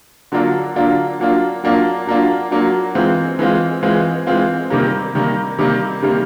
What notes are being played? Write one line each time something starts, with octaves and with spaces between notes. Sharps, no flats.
D3 F#3 A#3 D4 F4
D3 F#3 A#3 D4 F4
F#3 A#3 D4 F4
F#3 A#3 D4 F4
F#3 A#3 D4 F4
F#3 A#3 D4 F4
E3 G#3 C4 F4
E3 G#3 C4 F4
E3 G#3 C4 F4
E3 G#3 C4 F4
C3 D#3 G3 A#3
C3 D#3 G3 A#3
C3 D#3 G3 A#3
C3 D#3 G3 A#3